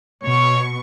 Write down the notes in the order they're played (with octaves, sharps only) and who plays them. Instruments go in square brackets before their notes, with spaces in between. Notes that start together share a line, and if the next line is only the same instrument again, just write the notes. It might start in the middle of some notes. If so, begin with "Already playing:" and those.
[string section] B2 C#6 [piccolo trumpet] C#5